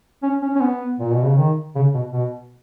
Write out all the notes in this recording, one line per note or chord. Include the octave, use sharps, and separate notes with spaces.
C#4
C#4
C#4
B3
A#2
B2
C#3
D#3
C#3
B2
B2